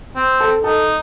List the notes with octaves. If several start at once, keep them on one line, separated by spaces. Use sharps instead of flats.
C4
A4
D#4 A4